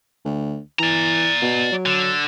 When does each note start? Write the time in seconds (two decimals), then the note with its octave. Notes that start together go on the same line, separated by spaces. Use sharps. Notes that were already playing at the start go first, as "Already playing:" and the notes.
0.25 D2
0.79 E3 D5 A#5
1.42 B2
1.72 F#3
1.86 D3